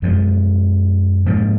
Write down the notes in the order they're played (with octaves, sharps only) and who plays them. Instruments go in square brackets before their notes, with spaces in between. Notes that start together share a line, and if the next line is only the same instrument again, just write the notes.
[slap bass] F#2 F3 G#3
G#2 F3 A#3